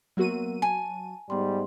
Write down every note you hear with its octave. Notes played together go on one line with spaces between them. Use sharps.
F#3 A#3 B3 F#4 A#4 D#7
G#5 A5
G#2 G3 B3 C6